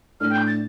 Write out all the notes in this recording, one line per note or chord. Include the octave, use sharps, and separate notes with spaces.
A2 A3 D4 F6
G5
G6
A6